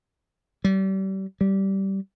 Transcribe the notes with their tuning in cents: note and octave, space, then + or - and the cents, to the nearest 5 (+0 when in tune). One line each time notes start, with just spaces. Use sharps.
G3 -35
G3 -15